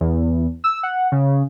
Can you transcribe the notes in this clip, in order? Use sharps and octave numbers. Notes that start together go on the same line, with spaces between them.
E2
E6
F#5
C#3